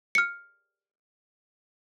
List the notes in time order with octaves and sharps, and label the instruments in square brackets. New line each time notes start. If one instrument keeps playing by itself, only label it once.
[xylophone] F6 C#7